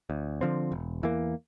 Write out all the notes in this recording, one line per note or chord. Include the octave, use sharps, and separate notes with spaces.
D2
D3 F3 C4
E1
E2 E3 A#3